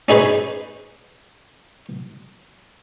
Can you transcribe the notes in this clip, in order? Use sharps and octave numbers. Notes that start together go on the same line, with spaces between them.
C#4 D#4 G#4 B4 C5